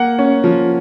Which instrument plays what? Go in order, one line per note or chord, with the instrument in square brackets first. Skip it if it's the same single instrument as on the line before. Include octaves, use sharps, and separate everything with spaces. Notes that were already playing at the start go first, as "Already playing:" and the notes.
Already playing: [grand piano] A#3 F#5
C#4
F3